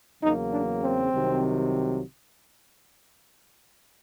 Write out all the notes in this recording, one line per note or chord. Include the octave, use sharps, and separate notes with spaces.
E2 C#3 F#3 A#3 D#4
D4
C4
C2 C3 D#3 F#3